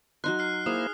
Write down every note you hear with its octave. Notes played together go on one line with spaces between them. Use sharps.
F#3 D#4 C6 F#6
F6 C7
A#3 E4 G#4 C5 D#6